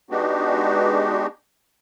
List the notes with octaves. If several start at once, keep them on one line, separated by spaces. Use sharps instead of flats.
G#3 B3 D4 D#4 F#4 G4